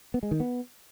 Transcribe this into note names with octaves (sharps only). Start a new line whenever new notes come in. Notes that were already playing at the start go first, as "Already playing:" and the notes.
B3
G#3
D#3
B3